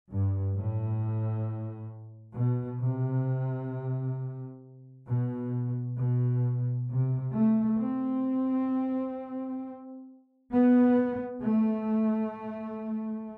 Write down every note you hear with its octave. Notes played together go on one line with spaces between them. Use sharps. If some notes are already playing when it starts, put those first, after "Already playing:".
G2
A2
B2
C3
B2
B2
C3
A3
C4
B3
A3